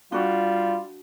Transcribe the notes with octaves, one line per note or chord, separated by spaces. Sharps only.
G3 D4 F4 F#4